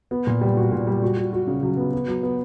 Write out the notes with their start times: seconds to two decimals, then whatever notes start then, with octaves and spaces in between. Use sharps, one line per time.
0.11 B3
0.27 A#2
0.41 G3
0.57 F#4
0.72 A#2
0.87 G3
1.02 F#4
1.17 F#4
1.33 F#4
1.47 C#3
1.63 F#3
1.77 B3
1.93 B3
2.08 F#3
2.23 B3